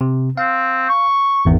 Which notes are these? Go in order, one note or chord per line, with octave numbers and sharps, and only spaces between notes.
C3
C4 F5
C#6
G#1 E2 D#3